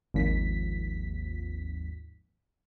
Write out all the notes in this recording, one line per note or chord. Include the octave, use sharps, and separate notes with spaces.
G#1 D#2 F3 B6